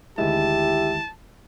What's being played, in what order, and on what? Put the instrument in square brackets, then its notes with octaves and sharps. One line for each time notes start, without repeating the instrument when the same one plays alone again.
[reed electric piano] D2 D#3 G#3 [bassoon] E4 [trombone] G4 [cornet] A5